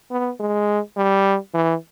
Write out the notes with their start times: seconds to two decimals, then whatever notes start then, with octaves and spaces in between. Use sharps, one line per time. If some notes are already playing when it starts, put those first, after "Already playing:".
0.11 B3
0.40 G#3
0.97 G3
1.54 E3